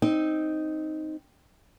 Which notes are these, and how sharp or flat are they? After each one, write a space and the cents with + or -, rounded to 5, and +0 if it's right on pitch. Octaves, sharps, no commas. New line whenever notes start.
C4 +0 D#4 +0